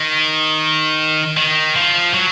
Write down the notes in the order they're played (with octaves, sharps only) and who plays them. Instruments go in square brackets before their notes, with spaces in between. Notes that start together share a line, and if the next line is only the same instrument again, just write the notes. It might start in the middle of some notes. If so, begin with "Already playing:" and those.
Already playing: [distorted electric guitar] D#3
D#3
F3
F#3